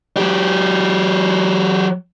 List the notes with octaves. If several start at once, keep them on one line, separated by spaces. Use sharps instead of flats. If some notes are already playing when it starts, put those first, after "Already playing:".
F#3 G4